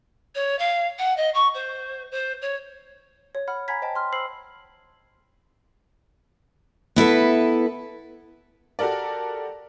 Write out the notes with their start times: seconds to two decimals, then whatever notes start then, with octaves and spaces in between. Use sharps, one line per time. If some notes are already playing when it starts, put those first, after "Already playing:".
0.35 C#5
0.58 F5
0.98 F#5
1.17 D#5
1.34 C#6
1.54 C5
2.11 C5
2.41 C#5
3.35 C#5
3.48 F#5 B5 F6
3.68 F#5 G#5 A#5 B5 G#6 B6
3.82 C5 D#5 G5 A5
3.96 C6 F6
4.12 C5 B5 E6 C7 F#7
6.96 B3 E4 A4 B4
8.79 F#4 G4 A4 A#4 D5